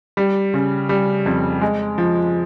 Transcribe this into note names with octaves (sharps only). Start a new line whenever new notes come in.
G3
C#3
G3
F2
G#3
F3